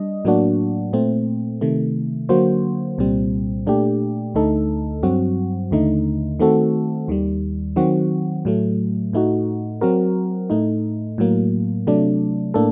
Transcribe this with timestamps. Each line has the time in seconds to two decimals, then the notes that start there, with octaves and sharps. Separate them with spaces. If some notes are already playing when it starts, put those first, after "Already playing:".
Already playing: G3 D4 D#5
0.25 A2 F#3 A#3 D4 F#4
0.93 A#2 A3 C4
1.61 C3 D#3 A3
2.29 D3 F#3 A#3 F#4 C5
2.98 C2 A#2 G3 C4
3.67 A#2 A3 D4 G4
4.35 D2 D3 A3 D#4 A4
5.03 G2 F#3 C4 F#4
5.71 D#2 D3 A3 D#4
6.40 D#3 A3 C4 F#4 A4
7.08 D#2 D#3 G3
7.76 D#3 F#3 C4 F#4
8.45 A2 F#3 A3
9.13 A2 A3 D#4 F#4
9.81 F#3 C4 F#4 A#4
10.50 A2 A3 D#4
11.18 A2 F#3 A#3
11.87 C3 F#3 A3 D4
12.54 A2 A#3 D4 A4